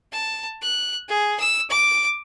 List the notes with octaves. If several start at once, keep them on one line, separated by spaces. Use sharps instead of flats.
A5
F#6
G#4
E6
D6